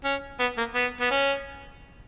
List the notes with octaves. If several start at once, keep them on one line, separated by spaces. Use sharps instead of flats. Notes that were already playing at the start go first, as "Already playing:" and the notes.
C#4
B3
A#3
B3
B3
C#4